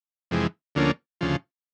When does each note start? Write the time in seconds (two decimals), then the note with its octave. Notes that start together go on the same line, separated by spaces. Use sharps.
0.31 F2 C3 E3 G#3
0.75 D2 D3 F3 A#3 C#4
1.21 D2 C#3 F3